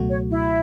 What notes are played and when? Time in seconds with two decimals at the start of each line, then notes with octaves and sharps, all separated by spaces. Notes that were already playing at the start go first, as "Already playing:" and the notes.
Already playing: C#2 B2 F#3 A3 F#4
0.10 C#5
0.30 E4